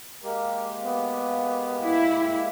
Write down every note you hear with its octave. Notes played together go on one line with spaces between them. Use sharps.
G#3 A#3 G4 A#4
B3
E4